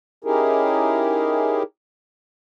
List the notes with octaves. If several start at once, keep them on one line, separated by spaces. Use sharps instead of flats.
C#4 D#4 E4 G4 G#4 A#4